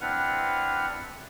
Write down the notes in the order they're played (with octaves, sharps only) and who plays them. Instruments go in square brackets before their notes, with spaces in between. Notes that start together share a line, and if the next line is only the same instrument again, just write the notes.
[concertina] C4 D4 E4 B4 F#5 F6